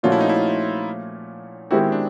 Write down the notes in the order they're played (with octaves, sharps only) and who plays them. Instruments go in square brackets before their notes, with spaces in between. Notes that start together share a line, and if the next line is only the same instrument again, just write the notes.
[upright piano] A#2 F3 A3 C#4 F#4 [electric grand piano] F4
[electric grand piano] E4
D#4
E4
[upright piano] D#3 G#3 C4 E4 G4 [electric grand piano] F#4
[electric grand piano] D4